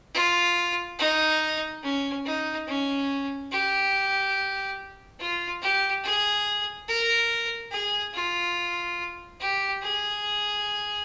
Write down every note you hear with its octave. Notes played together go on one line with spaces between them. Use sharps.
F4
D#4
C#4
D#4
C#4
G4
F4
G4
G#4
A#4
G#4
F4
G4
G#4